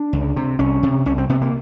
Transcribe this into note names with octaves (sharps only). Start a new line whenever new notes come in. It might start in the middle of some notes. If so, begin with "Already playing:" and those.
Already playing: D4
C#2
C3
C2 C#4
C3
C2 C#4
C4
C3 B3
A#3